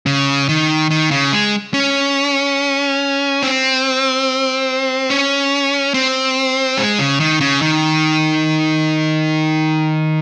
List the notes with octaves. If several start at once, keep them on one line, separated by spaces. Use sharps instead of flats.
C#3
D#3
D#3
C#3
G#3
C#4
C4
C#4
C4
G#3
C#3
D#3
C#3
D#3